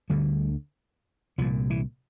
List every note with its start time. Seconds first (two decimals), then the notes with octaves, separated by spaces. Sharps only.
0.10 D2 D3 G3
1.38 C2 A#2 F3
1.70 E3